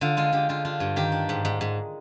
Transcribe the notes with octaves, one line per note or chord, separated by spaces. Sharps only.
D3 F4
G#3 F4
D3 G4
D3 F4
D4 F4
G2
D#3 G4
D4
G#2
G#2
G#2